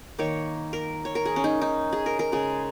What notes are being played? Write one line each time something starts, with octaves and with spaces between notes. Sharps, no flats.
D#3 A#3 C#5
A#4
C#5
A#4
G#4
C#4
D#4
D#4
G#4
A#4
A#4
C#3 G#3 G#4